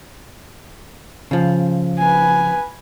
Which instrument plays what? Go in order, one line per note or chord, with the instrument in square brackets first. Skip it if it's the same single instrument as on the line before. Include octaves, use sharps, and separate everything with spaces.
[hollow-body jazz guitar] C#3 F3
[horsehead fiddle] B4 G#5